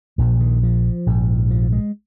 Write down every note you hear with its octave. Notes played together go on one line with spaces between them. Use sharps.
A#1 A#2 F3
D#3
F3
A#1 G#2
F3
G#3